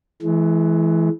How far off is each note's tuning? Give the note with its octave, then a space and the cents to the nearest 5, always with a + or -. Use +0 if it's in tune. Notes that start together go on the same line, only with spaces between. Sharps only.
E3 +0 G#3 +40